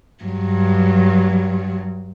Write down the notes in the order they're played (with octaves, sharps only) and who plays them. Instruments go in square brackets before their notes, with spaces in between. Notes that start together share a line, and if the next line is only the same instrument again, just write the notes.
[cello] G2 F#3